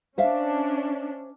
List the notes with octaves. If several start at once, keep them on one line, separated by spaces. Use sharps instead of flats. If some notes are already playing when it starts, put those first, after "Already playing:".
C#4 D4 C5 E5 F5